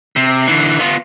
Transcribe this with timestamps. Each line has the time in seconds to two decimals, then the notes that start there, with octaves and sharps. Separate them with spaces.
0.16 C3
0.48 D3 E3
0.79 B3 F4